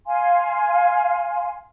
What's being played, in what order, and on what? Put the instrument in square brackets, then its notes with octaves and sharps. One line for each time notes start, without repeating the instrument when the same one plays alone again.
[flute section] F5 G#5 C6